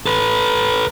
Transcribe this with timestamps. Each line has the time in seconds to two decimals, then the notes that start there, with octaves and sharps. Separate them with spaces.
0.06 A4 B4